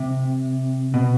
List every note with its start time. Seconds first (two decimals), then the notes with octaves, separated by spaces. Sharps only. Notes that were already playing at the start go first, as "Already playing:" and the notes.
Already playing: C3
0.94 B2